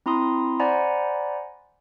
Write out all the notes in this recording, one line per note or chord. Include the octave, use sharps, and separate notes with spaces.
C4 E4 A#5 C6 D#6
C5 D5 F#5 G#5 A#5 B5